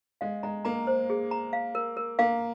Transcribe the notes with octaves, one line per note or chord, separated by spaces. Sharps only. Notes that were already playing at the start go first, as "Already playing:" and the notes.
G#3 F5
G#3 A#5
A#3 A#5
C5
G#4
A#5
F5
A#4
A#4
A#3 F5